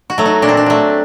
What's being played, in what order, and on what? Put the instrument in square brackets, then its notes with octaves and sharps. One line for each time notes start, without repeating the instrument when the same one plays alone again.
[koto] F#4
F#3 A3
D#4
A#2 D4
C4
D4
F#3 A3